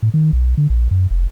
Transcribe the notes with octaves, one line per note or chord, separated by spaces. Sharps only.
A2
D#3
B1
D3
A#1
F#2
F1